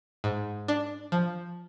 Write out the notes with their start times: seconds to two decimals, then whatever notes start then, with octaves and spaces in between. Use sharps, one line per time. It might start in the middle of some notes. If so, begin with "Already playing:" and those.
0.24 G#2
0.68 D4
1.12 F3